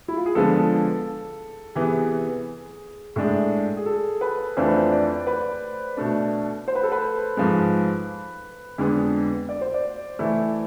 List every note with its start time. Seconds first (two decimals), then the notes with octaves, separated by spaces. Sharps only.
0.08 E4
0.17 F4
0.26 G#4
0.35 D3 F3 G#3 B3 A4
1.75 C3 E3 B3 G#4
3.16 A2 G#3 D4 A4
3.77 G#4
3.86 A4
4.21 B4
4.57 F2 E3 A3 D4 F4 C5
4.67 B4
4.77 C5
4.92 D5
5.27 B4
5.97 B2 A3 D4
6.68 C5
6.75 B4
6.83 A4
6.92 B4
7.37 G#2 F3 G#3
8.78 F2 D3 G#3 B3
9.49 D5
9.61 C5
9.74 D5
10.19 E3 A3 E4